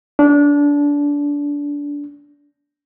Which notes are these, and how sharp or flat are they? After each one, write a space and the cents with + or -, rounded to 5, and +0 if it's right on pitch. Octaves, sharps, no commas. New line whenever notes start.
D4 -25